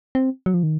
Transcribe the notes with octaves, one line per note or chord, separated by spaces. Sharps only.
C4
F#3
F3
D#3